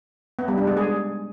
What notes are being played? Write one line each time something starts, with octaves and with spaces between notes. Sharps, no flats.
B3
G3
D4
G#3
G#4